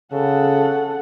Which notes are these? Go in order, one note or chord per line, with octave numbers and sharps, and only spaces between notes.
C#3 A4 F#5